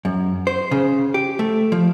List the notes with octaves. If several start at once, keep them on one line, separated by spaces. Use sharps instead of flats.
F#2
C5
C#3
G4
A3
F3